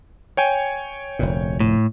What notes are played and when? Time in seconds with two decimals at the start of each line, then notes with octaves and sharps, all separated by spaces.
0.37 C#5 G5 G#5
1.19 F1 D2 A#2
1.60 A2